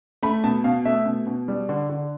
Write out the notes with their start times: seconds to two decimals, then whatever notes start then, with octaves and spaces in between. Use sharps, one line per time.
0.23 A3 B5
0.44 B2 A5
0.64 B2 F5
0.85 A3 E5
1.06 B2
1.27 B2
1.48 G3
1.69 D3
1.90 D3